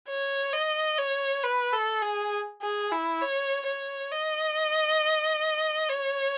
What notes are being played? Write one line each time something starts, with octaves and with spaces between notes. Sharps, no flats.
C#5
D#5
C#5
B4
A4
G#4
G#4
E4
C#5
C#5
D#5
C#5